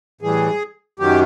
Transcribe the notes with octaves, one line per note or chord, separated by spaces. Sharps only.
A2 E3 G3 G#4
F#2 D#3 F#3 G4